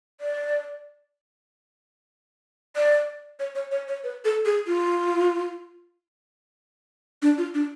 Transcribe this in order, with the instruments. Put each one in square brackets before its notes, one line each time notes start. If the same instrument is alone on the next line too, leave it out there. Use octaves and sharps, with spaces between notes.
[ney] D5
D5
C#5
C#5
C#5
C#5
B4
A4
G#4
F4
D4
F4
D4